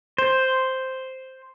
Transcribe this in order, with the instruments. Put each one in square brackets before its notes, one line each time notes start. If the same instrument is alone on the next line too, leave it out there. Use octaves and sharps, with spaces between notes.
[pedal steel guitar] C5